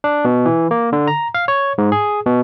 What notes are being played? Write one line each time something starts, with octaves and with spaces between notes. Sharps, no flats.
D4
B2
E3
A#3
D3
A#5
F5
C#5
G#2
G#4
B2